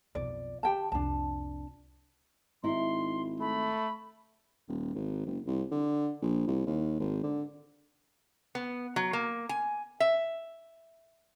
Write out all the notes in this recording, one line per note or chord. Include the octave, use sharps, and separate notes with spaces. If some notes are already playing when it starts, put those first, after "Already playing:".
B1 F2 D5
D3 G4 G5 A5
C2 F2 D4 A5
G#1 D#4 E4 C6
A3 B5
D#1
G#1
F#1
C2
D3
A#1
C2
D#2
G#1
D3
B3
F#3
A#3
G#5
E5